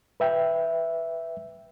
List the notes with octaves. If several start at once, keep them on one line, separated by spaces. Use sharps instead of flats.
B4 E5 G5